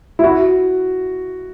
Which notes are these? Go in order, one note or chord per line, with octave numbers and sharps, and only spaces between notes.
E4
F#4